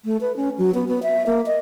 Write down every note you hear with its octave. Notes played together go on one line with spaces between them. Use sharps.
A3
B4
C#4
F#3
B3
B3
E5
A#3
D#5